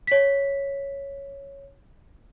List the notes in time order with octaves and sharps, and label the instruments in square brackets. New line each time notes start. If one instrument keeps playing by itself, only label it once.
[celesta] C#5 B6